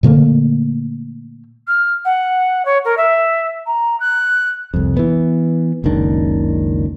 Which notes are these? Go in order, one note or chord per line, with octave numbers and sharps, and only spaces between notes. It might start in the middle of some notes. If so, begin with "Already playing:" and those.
A#2 D3 A3 A#3
F6
F#5
C#5
A#4
E5
A#5
F#6
C2 F2
E3 B3
F#1 C#2 D#3 D4